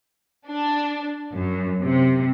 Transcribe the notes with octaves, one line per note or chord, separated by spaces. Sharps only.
D4
F#2
C3